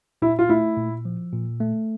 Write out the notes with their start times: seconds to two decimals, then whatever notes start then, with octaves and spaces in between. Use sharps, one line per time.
0.22 A#2 E4
0.39 F4
0.49 A3 E4
0.77 A#2
1.05 F3
1.33 A#2
1.60 A3